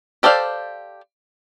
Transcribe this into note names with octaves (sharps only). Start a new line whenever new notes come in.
G4 A4 C5 D5 F5